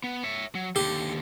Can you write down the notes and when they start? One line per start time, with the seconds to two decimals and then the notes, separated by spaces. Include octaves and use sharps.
0.04 B3
0.24 C#5 E5
0.55 F#3
0.76 D#2 D3 G4